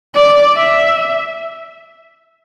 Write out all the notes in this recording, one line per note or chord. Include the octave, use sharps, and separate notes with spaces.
D5
E5